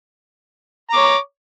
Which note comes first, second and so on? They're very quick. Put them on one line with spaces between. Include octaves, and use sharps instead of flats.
A#5 D6 C#5